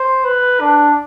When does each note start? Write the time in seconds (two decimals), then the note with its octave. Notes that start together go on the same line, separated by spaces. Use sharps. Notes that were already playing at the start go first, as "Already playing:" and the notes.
Already playing: C5
0.24 B4
0.60 D4